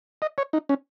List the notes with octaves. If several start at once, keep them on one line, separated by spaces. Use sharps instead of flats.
D#5
C#5
D#4
C#4